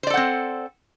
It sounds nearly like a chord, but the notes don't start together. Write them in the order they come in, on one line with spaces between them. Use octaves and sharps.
C5 D5 A4 F#5 C4